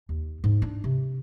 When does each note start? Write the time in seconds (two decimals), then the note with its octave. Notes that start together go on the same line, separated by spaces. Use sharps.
0.09 D#2
0.44 G#2
0.62 D4
0.84 C3